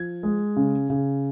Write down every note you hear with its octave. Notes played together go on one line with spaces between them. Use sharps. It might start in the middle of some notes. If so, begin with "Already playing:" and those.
Already playing: F3 G#6
G#3
C#3
C#3